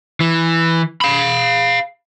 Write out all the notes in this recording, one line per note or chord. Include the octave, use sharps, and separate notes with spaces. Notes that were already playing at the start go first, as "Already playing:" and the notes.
E3
F5 B5